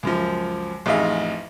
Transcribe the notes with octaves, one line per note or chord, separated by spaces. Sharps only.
C#2 F#2 F3
A1 F2 D#4 G#4 E5 F5